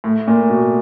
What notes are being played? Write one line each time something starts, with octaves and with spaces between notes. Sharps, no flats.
A2
A#2
B2